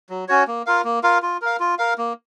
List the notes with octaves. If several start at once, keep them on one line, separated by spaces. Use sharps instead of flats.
F#3
C#4 F#4 C#5
A#3
F4 A#4 F5
A#3
F4 A#4 F5
F4
A#4 F5
F4
A#4 F5
A#3